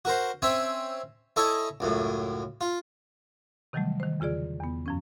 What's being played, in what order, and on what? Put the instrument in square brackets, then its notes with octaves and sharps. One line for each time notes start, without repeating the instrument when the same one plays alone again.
[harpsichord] F#4 A#4 C5
C4 C#4 C#5 E5 G#5
E4 A4 C#5 D#5 G#5
C#2 F#2 A2
F4
[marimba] C3 D#3 E3 F#3 G3 A3
D#3 C5
E2 C#3 F4 G#4 D5
E2 B3
F#2 F3 C#4